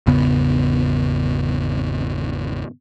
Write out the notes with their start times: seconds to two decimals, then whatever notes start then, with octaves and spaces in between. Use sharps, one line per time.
0.07 G#1 E2 C#3 B3